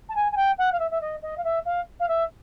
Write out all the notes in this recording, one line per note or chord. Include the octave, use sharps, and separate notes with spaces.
A5
G#5
G#5
G5
F#5
F5
E5
E5
D#5
D#5
F5
E5
F5
F5
E5